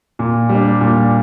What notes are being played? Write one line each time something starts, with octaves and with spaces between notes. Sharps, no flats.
A#2
G3 D4
A#2